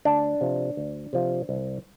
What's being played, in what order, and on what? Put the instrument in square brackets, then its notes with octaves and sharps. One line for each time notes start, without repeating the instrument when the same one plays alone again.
[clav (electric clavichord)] D2 D4
C3 F3
D2
C3 F3
C2